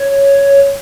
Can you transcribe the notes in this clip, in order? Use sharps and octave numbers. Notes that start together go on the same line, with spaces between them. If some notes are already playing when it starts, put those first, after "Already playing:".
Already playing: C#5